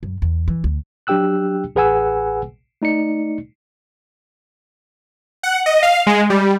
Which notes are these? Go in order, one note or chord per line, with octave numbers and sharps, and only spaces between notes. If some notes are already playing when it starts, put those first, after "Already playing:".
F#2
E2
E3
D2
F#3 D4 G4 G5 E6 F#6
A1 G#4 B4 F#5 G#5 E6
A3 D#4 D5 C#7
F#5
D#5
F5
G#3
G3